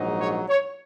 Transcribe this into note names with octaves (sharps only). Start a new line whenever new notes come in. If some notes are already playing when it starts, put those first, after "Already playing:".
Already playing: A#1 G#2 F#3 D#4
C#5
C#5